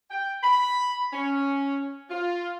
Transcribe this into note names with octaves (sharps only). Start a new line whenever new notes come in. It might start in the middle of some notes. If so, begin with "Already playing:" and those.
G5
B5
C#4
F4